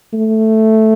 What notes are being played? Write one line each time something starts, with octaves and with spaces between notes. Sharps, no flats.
A3